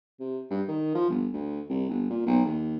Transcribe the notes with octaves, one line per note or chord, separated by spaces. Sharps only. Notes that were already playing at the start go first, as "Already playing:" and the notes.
C3
G2
D#3
F3
G1
D2
C2
G1
A#2
B1
D#2